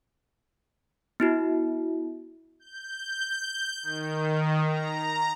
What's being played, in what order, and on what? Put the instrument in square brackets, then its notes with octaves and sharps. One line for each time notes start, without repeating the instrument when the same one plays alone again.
[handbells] B3 E4 F#4
[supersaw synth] G6
D#3
A#5